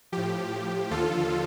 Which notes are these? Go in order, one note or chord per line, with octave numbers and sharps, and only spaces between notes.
A2 F3 G4
D#2 D3 F3 F4 A4